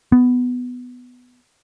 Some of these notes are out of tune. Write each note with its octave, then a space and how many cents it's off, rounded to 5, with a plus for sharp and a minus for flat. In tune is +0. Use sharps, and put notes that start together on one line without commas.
B3 +10